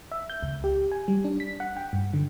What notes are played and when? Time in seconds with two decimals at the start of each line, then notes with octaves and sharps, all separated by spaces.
0.12 E5
0.30 G6
0.43 C#2
0.64 G4
0.92 G#5
1.08 G3
1.25 D4
1.40 B6
1.60 F#5
1.77 G5
1.93 G2
2.14 D3